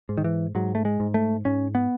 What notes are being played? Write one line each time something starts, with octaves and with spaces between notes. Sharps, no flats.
G#2
D#3
E3
G#2 F#3
A3
G#3
G#2
A3
G#2 C#4
B3